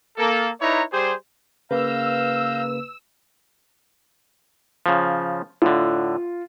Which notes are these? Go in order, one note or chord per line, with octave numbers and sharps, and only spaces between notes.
A#3 A4
D#4 E4 B4 C#5 D5 A#5
G3 G4 G#4 C5
C#3 A#3 B4 F5 A#5 E6 G6
C#3 F3
A2 D3 F4